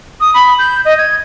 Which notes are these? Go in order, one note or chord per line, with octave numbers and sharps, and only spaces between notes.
D#6
B5
G6
D#5
G#6